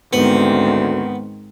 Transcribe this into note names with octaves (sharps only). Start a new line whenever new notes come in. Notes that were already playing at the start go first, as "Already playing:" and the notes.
D2 G#2 D#3 B3 C4